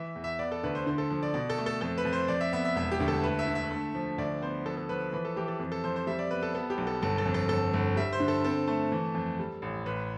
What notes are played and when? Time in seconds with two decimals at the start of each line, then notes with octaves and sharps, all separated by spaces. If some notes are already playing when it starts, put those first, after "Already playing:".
Already playing: E3 E5
0.15 E2
0.24 E5
0.39 B3 D5
0.52 A4
0.63 D2 B4
0.75 C5
0.86 D3 C5
0.98 A4
1.10 F3
1.23 D5
1.34 B2 D5
1.50 A4
1.58 A3
1.66 A4
1.81 F2 A4
1.98 B4
2.05 F2
2.13 C5
2.28 F2 D5
2.41 E5
2.53 B3 E5
2.65 E5
2.76 E1 E5
2.91 G4
3.00 D2
3.08 A4
3.23 A3 B4
3.39 E5
3.47 D3
3.55 E5
3.71 A3
3.95 F3
4.18 D2 D5
4.41 B3 C5
4.66 F3 A4
4.77 A4
4.89 F3 B4
5.13 E3 B4
5.25 A4
5.36 E3 G4
5.48 A4
5.60 F2
5.72 A4
5.84 F2 C5
5.96 C5
6.07 G3 E5
6.19 D5
6.31 B3 B4
6.43 A4
6.54 B3 A4
6.70 G4
6.78 B1
6.87 A4
7.02 G1 A4
7.18 A4
7.26 F2
7.34 A4
7.49 G1 A4
7.74 G1
7.96 G3 E5
8.13 C5
8.20 D3
8.28 A4
8.44 C4 A4
8.67 A3
8.92 E3
9.15 F2
9.39 G3
9.62 A1
9.86 A1 B4